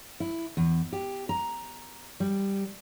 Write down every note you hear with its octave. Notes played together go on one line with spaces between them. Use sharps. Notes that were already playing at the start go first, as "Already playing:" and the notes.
E4
E2
G4
A#5
G3